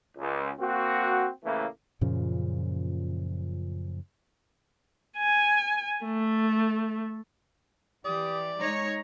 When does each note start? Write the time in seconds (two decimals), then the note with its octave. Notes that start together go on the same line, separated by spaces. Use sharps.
0.17 C#2
0.60 A#3 C4 F#4
1.44 A2 C#3 E3 A3 A#3
2.01 F#2 A#2 C#3 F3
5.18 G#5
6.05 A3
8.05 E3 G4 D5 D#6
8.60 G#3 D#4 C#5 A#5